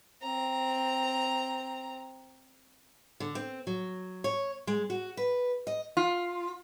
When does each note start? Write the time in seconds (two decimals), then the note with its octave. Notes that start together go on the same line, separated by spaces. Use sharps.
0.23 C4 A#5
3.20 D3
3.35 C4
3.67 F#3
4.24 C#5
4.67 G#3
4.90 F#4
5.17 B4
5.67 D#5
5.97 F4